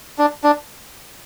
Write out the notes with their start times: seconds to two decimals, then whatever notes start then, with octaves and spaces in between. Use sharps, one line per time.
0.19 D4
0.44 D4